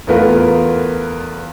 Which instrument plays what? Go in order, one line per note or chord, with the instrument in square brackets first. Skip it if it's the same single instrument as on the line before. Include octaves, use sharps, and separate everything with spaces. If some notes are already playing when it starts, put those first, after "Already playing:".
[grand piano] E2 A3 B3 F4 A#4